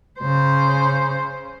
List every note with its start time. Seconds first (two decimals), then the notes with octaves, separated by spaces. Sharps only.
0.20 C#3 C5